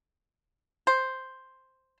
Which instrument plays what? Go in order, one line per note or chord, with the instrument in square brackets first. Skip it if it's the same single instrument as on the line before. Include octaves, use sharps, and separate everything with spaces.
[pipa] C5